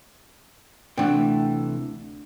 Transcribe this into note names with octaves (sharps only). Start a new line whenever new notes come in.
D2 C3 E3 A3 D4 F#4 G5